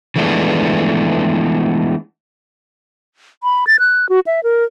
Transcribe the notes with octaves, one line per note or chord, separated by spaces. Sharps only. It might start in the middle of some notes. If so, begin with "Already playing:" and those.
E3 F3 G#3 A3 B3 D4
B5
A6
F#6
F#4
E5
A#4